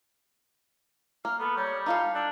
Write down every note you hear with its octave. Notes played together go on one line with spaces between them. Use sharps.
A#3 F6
B3 A4
G3 C#5
D#4 F4 A4 F5
D4 E6